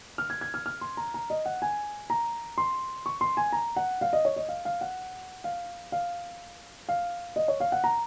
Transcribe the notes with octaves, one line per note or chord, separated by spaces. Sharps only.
F6
G#6
G#6
F6
F6
C6
A#5
A#5
D#5
F#5
G#5
A#5
C6
C#6
C6
G#5
A#5
F#5
F5
D#5
C#5
D#5
F5
F5
F#5
F5
F5
F5
D#5
C#5
F5
F#5
A#5